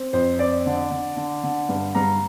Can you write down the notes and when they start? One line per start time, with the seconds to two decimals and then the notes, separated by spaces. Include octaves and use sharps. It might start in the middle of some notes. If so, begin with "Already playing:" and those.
Already playing: C4
0.13 F2 C5
0.39 C4 D5
0.66 D3
0.91 D3
1.17 D3
1.44 D3
1.69 G2
1.95 G2 A#5